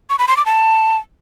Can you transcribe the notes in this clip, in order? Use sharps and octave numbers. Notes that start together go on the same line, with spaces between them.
C#6
B5
C6
D6
A5